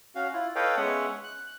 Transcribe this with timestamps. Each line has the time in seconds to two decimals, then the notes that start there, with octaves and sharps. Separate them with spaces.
0.15 C#4 F#4 F5
0.33 E4 F4
0.55 A4 B4 C#5 D#5 F5 G5
0.77 G#3 B3 C#4 C#5 E5 F#5
1.23 F#6